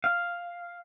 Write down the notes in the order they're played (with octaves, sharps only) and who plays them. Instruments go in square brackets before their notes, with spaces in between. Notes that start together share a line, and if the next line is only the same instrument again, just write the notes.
[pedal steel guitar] F5